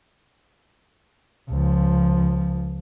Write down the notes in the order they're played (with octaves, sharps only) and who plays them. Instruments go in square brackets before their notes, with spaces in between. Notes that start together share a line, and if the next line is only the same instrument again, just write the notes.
[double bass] C#2 F3